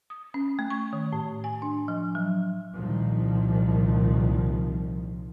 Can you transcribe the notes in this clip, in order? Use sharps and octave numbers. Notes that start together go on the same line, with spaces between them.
D#6
C#4
A3
C#6
D#3
A2
G#5
D4
F3
F#3
C2 A#2 D#3 F3